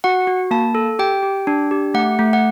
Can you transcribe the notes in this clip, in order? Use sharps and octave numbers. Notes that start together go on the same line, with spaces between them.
F#4 F#5
F#4
A#3 A5
A4
G4 G5
G4
D4
G4
A3 F#5
A3
F#5